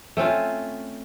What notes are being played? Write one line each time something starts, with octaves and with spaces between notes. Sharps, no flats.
A3 C4 C#4 F4